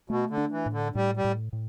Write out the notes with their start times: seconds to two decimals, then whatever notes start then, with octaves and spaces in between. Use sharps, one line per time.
0.10 B2 A3
0.30 D3
0.37 D4
0.52 E3
0.66 A2
0.73 D3
0.95 A2 G3
1.17 G3
1.24 A2
1.53 A2